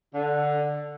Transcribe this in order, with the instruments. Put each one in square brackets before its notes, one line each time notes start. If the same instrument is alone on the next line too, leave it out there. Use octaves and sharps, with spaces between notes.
[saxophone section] D3